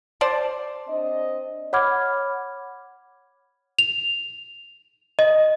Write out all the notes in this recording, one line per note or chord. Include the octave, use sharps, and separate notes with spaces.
C5 D5 A5
C4 D4 D#5
C#5 F#5 B5 D6 F6 G#6
F7
D#5